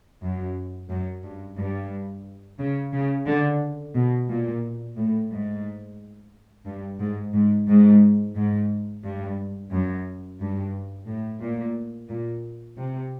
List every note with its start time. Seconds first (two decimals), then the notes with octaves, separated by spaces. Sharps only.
0.22 F#2
0.89 F#2
1.23 G2
1.57 G2
2.59 C#3
2.92 C#3
3.27 D3
3.95 B2
4.29 A#2
4.97 A2
5.31 G#2
6.65 G2
7.00 G#2
7.34 G#2
7.68 G#2
8.35 G#2
9.03 G2
9.71 F#2
10.40 G2
11.07 A2
11.41 A#2
12.09 A#2
12.77 C3